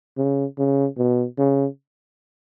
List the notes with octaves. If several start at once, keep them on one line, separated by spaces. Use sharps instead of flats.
C#3
C#3
B2
C#3